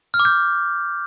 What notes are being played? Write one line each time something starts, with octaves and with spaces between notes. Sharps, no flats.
F6
D6
G6